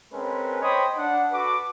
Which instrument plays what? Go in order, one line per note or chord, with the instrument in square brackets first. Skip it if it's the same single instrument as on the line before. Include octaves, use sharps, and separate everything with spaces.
[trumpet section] G#3 C4 C#4 A#4 B4
C5 C#5 D#5 G5 B5 D#6
D4 F#5
F#4 A4 B4 D6